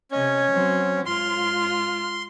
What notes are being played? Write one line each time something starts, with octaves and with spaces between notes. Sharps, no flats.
C3 C#4 D#5 G#6
F#3 C4
G#2 F4 C6 F6